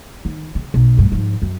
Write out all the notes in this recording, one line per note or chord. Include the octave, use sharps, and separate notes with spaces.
D#3
C#3
B1
D2 G2
G#2 F3
F#2